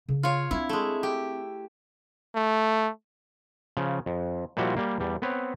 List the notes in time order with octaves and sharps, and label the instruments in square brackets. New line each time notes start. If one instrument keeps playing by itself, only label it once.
[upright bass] C#3
[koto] F4 C#5
[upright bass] C4 D4 [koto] E4
[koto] G#3 A3
G4
[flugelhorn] A3
[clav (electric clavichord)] C#3 F3
F2
A#2 F3 G3 E4 F#4
G3 A#3
E2 G3
B3 C4 B4 C#5